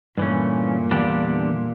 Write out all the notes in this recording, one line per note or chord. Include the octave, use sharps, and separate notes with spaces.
G2 A#2 E3 A3 C#4
E2 D3 G3 D4 G4